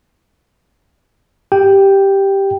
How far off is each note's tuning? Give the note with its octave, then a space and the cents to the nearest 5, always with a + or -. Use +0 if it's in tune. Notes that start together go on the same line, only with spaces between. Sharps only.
G4 +0 G5 +0